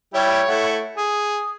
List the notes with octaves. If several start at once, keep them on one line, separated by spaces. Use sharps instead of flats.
G3 E4 G4 C#5
A3 E4 F#5
G#4 D#6